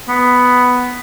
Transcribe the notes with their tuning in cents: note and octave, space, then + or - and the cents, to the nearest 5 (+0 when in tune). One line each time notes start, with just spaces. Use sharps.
B3 +5